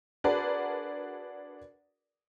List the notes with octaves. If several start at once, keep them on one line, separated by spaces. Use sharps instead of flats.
D4 F#4 G#4 A#4 B4 D5